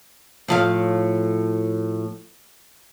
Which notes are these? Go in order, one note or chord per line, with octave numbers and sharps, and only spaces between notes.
A2 F3 F5